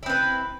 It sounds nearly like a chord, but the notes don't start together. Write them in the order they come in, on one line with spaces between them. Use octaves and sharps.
E4 C4 B4